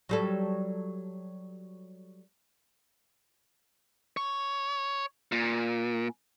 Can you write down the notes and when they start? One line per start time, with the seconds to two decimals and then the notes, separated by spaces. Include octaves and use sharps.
0.09 F#3 G3 A4
4.17 C#5
5.32 A#2